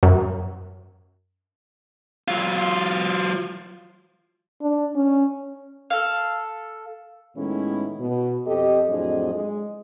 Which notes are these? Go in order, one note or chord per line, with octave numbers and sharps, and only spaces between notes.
F#2
F#3 F4
D4
C#4
A4 F5
A2 D#3 G#3 B3 C#4 E4
B2
F2 G4 A4 D#5
F2 A2 F#3 D4 G#4 D#5
G#3